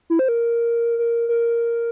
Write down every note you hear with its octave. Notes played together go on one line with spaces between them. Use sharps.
E4
C5
A#4
A#4
A#4